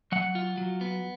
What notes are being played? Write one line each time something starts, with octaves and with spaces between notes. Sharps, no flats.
F#3 F#5
F4
F#3
B3